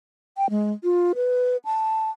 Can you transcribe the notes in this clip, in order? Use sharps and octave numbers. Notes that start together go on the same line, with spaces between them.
G5
G#3
F4
B4
A5